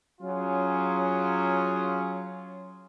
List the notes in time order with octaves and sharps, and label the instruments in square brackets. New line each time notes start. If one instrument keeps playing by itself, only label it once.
[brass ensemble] F#3 C#4 F4 G#4